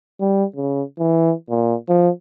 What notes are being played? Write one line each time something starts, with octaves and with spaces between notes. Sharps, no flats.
G3
C#3
E3
A#2
F3